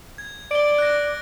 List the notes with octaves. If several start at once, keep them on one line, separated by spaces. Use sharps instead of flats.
G#6
D5 D7 G7
F#6 A#6